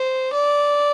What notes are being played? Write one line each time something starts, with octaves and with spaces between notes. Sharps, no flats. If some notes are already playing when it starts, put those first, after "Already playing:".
Already playing: C5
D5